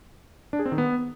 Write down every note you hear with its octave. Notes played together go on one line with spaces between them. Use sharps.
D4
G#4
C4
D#3
B3